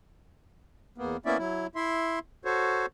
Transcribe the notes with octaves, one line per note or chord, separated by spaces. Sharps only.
E2 A#3 B3
A#3 B3 C#4 E4 D5 E5
F#3 E4
E4 E5 C6
F#4 A4 C5 C#5